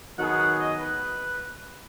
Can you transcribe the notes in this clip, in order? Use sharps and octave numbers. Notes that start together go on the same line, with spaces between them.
D#3 F#3 B3 G#4 F#5
D#5
B4